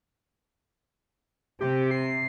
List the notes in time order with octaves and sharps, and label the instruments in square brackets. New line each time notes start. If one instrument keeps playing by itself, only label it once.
[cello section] C3 [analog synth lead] G4
[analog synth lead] C7